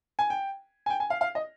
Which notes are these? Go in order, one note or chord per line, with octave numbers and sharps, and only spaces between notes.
G#5
G5
G#5
G5
G#5
F5
F5
D#5